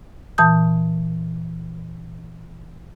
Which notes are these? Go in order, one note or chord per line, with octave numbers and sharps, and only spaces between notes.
A#2 E3 A5 D#6 G6